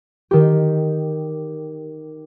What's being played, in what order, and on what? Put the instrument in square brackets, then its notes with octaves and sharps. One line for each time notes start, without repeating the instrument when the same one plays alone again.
[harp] D#3 G4